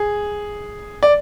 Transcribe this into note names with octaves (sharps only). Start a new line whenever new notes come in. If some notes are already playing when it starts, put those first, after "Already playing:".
Already playing: G#4
D5